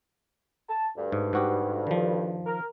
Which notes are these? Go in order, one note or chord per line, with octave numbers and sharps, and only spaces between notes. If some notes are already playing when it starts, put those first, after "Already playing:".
A5
D2 G2
G#2
G#2 F#4 G4
D#3 F3
A#4